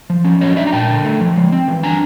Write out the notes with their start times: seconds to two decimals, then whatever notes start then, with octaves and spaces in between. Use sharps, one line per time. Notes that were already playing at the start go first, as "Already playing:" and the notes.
0.10 F3
0.25 C#4
0.41 F#3 C#5 D#5
0.56 D4 D5 E5
0.67 A#5
0.73 A#2 G5 A5
0.88 D3
1.04 A3
1.20 F3
1.36 G#3
1.52 C4
1.68 E3
1.83 D4 G#5 A#5